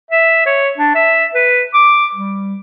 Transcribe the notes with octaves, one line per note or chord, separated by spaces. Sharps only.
E5
C#5
D4
E5
B4
D6
G3